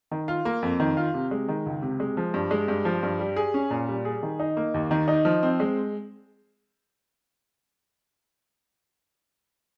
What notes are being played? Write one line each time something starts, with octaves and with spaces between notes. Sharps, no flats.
D#3
F4
A#3
F2
D#3
F4
C3
G#3
D#3
C#2
C3
G#3
F3
G2
G#3
G2
F3
G2
G3
G#4
C#4
A#2
G3
G#4
D#3
D#4
A#3
D#2
D#3
D#4
F3
C4
G#3